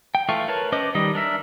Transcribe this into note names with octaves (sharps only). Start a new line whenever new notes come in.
G5
E3 A3 F4 C#6
A#4 B4 C#5 A5
C#4 B4 C5 D#5 D6
D#3 G3 D#5
D4 A#4 E5